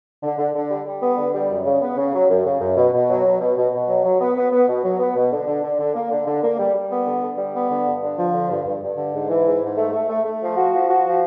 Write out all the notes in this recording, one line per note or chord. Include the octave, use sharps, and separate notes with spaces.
D3
D3
D3
G3
G3
B3
D3
G3
F#2
C#3
B3
C#3
F#3
F#2
C#3
F#2
B2
B2
F#3
B2
B2
B2
B2
F#3
F#3
B3
B3
B3
B2
F#3
B3
B2
D3
D3
D3
D3
A#3
D3
D3
A#3
G3
G3
B3
D3
D3
G3
B3
D3
G2
D3
F3
D3
G2
G2
G2
D3
G#2
E3
G#2
G#2
A3
A3
A3
A3
F3
F#4
F3
F#4
F3